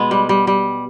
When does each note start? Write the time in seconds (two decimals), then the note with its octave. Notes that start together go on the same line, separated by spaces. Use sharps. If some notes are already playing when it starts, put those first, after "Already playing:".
Already playing: B2 G#3 B3
0.11 G3
0.29 G3
0.47 G3